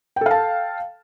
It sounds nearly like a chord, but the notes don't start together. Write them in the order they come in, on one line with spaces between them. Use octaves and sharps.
G5 A4 F5 A5